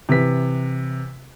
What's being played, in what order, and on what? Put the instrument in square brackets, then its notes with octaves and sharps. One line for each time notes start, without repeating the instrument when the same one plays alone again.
[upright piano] C3 E3 B4 B6